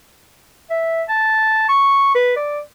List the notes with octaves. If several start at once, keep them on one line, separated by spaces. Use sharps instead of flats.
E5
A5
C#6
B4
D5